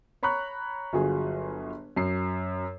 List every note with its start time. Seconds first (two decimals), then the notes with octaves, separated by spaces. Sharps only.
0.23 C#5 A#5 B5 C#6 F#6
0.93 G1 F#3 F4 F#4 G#4
1.96 F#2 C7